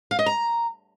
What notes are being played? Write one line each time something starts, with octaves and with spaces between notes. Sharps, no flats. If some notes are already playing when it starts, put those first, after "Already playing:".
F5
D#5
A#5